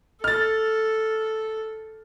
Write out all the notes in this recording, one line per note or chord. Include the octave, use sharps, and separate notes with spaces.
A4 F6 A6